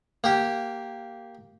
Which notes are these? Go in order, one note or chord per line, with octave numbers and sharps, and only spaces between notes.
A#3 G4